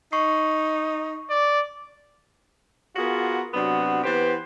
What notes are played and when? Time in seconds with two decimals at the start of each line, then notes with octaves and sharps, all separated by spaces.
0.12 D#4 C#6 C7
1.30 D5
2.96 B3 F4 F#4 G#4 A#4
3.53 C3 F#3 B3 D4 F#4
4.03 E3 B3 G4 B4 C5